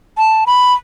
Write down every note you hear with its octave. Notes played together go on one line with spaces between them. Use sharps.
A5
B5